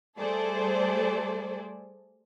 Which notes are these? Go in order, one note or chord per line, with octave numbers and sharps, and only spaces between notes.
G3 A3 G#4 A4 C5 D5